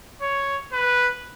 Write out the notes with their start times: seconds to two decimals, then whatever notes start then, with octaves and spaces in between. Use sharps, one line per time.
0.22 C#5
0.73 B4